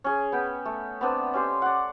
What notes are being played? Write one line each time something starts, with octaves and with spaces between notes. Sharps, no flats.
C#4 G#4
B3 G5 B5
A3
B3 C4 D4 B4
C#4 G4 C6
D5 F#5